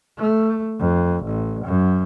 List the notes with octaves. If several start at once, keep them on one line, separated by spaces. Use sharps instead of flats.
A3
F2
A1
F#2